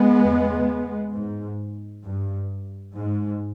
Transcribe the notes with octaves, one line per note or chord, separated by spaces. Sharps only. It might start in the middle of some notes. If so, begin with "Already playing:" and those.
Already playing: G#3 B3
E2
C#3
G#2
G2
G#2